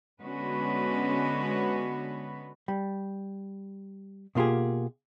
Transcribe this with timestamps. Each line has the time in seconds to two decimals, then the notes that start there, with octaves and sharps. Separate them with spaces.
0.21 D3 G#3 B3 C#4 F#4 B4
2.68 G3
4.35 B2 A#3 F4 G4 G#4